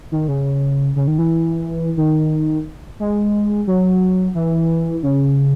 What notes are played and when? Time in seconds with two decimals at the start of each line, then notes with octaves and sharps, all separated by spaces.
0.12 D#3
0.28 C#3
0.96 C#3
1.07 D#3
1.18 E3
1.97 D#3
3.00 G#3
3.67 F#3
4.35 E3
5.03 C#3